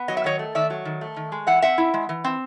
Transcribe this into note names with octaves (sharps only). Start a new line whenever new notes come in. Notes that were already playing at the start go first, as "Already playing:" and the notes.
Already playing: B3
F#3 D#5
E5
D#3 C#5 D#5
A3
D#3 D5 E5
F#3
D#3
A3
D#3
G#3
E3 E5 F#5
C4 E5 F#5
E4
G#3
E3
C4